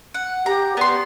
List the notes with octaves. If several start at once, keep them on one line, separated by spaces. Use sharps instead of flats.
F#5
G4 A#5
B3 D5 C6